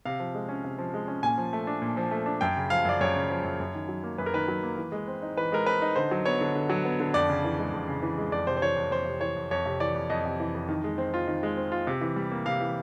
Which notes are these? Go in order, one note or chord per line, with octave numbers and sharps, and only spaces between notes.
C3 F5
F3
G#3
C#4
C3
F3
G#3
C#4
A#2 G#5
F3
A3
D4
A#2
F3
A3
D4
F#2 G5
C#3
F3 F5
F#2 D5
F#2 C#5
C#3
F3
F#2
F#2
D#3
F#3
A#3
F#2 B4
A#4
D#3 B4
F#3
A#3
E3
G#3
C4
D#4
E3 B4
G#3 A#4
C4 B4
D#4
D3 C5
F#3
B3 C#5
D3
D3
F#3
B3
D3
F2 D5
C#3
E3
G#3
F2
C#3
E3
G#3
F2 D5
C3 C5
C5
E3 C#5
F2
F2 C5
C3
E3 C#5
F2
F2 C#5
C3
E3 D5
F2
F2 D#5
C3
E3
F2
D#3
G#3
C4
F4
D#3
G#3
C4
F4
C3
E3
G3
A#3
C3 F5
E3